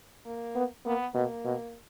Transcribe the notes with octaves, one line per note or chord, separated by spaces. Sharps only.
A#3
B3
A#3 B3
B2 A#3
B2